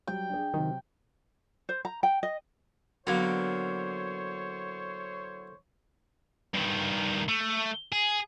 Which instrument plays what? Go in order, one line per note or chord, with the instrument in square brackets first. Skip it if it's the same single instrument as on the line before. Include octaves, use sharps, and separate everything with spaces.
[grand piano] F#3 G3 [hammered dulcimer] G5
[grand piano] D4 G#4
[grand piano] C3 F#3 [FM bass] D#3
[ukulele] C5
A#5
G5
D#5
[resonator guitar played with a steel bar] D3 A#3 [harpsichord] F#3 B3 [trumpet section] E4 C5 C#5
[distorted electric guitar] G2 D#3
A3
G#4